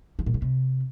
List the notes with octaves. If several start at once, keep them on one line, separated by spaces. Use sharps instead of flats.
E3
A#2
C#3
C3